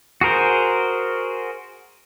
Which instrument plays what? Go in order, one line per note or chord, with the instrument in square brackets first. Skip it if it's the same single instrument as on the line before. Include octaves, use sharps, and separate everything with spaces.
[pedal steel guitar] F#4 G#4 A#4 C5